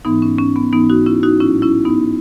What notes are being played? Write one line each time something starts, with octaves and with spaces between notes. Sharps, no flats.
G#2 E3 B3 D#4
C#4
C#4
B3
G#2 E3 B3 D#4
D#4 F#4
C#4 E4
D#4 F#4
A2 F#3 C#4 E4
C#4 E4
B3 D#4